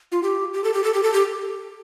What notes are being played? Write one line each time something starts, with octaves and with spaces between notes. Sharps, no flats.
F4
G4
G4
A4
G4
A4
G4
A4
G4